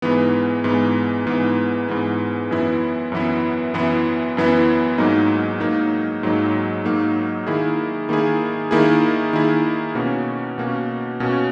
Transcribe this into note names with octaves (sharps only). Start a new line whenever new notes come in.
G#2 E3 B3
G#2 E3 B3
G#2 E3 B3
G#2 E3 B3
F#2 E3 B3 E4
F#2 E3 B3 E4
F#2 E3 B3 E4
F#2 E3 B3 E4
G#2 F#3 A#3 D#4
G#2 F#3 A#3 D#4
G#2 F#3 A#3 D#4
G#2 F#3 A#3 D#4
D#3 A#3 E4 G#4
D#3 A#3 E4 G#4
D#3 A#3 E4 G#4
D#3 A#3 E4 G#4
B2 A#3 C#4 F#4
B2 A#3 C#4 F#4
B2 A#3 C#4 F#4